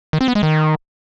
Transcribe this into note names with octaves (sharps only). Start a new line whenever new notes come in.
D#3
C4
B3
G#3
D#3